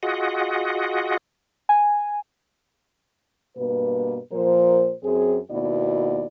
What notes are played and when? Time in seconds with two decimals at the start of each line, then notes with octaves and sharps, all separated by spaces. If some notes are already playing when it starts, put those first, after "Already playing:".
0.03 F4 F#4 G#4 D#5 F#5
1.69 G#5
3.57 G2 B2 A#3 B4
4.32 A#2 F3 A#4 C5
5.03 F#2 C4 G#4
5.50 D#2 B2 B3 E4 F#4 D5